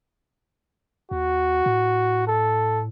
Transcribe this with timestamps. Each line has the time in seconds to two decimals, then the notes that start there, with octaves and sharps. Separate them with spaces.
1.11 D#2 F#4
1.66 A2
2.27 A4